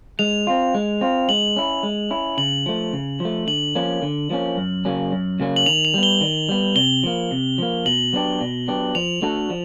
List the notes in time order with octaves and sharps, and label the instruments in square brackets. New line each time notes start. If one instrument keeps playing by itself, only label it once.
[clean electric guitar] G#3 [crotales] F7
[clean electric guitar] C4 F4
G#3
C4 F4
[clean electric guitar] G#3 [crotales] F#7
[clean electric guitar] C#4 E4
G#3
C#4 E4
[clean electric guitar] C#3 [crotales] F#7
[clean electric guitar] F3 A3
C#3
F3 A3
[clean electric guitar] D3 [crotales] F#7
[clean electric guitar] F3 A#3 C#4
D3
F3 A#3 C#4
F#2
C#3 F#3 A#3 C#4
F#2
C#3 F#3 A#3 C#4
[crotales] F#7
[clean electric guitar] D#3 [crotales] F7
[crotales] F7
[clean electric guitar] G3 B3
[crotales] G7
[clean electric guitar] D#3
G3 B3
[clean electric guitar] C3 [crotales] G7
[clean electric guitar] F3 A#3
C3
F3 A#3
[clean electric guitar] B2 [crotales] F#7
[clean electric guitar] F#3 B3 D4 G4
B2
F#3 B3 D4 G4
[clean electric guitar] F3 [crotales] F7
[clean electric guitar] A3 D4 F#4 A4
F3